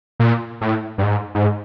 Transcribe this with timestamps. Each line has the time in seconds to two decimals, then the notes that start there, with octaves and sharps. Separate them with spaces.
0.20 A#2
0.61 A2
0.98 G2
1.03 G#2
1.35 G#2